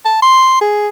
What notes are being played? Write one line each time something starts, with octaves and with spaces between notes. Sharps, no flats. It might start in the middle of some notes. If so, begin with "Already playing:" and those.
A5
C6
G#4